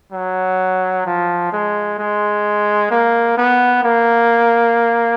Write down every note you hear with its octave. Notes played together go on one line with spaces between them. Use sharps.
F#3
F3
G#3
G#3
A#3
B3
A#3